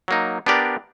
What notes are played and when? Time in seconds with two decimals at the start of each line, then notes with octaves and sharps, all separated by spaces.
0.08 F#3 A#3 D#4
0.46 B3 D4 G4 A#4 D5